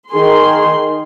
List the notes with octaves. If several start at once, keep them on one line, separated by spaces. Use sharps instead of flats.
D#3 G#4 C6